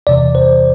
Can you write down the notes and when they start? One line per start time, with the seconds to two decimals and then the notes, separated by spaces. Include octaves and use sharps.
0.07 E2 C3 E3 D5
0.35 C5